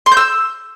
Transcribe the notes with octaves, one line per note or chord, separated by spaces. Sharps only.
C6
G6
E6